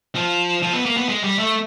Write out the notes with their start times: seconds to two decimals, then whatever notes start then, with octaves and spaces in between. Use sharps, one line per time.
0.15 F3
0.63 F3
0.73 B3
0.85 A#3
0.97 B3
1.09 G#3
1.24 G3
1.39 A3